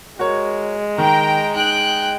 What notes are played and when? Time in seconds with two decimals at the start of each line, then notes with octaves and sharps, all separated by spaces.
0.19 G#3 F#4 A#4 C#5
0.98 D#3 G5 A#5
1.55 D#4 G5 F#6